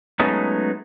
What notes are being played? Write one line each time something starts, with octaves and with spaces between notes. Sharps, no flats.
F#3 G#3 A3 B3 C#4 D#4